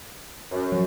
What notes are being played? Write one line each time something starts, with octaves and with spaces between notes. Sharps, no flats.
F#2
F3 F#3